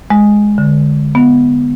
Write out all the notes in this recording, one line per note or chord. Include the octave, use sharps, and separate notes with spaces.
G#3
D3
B3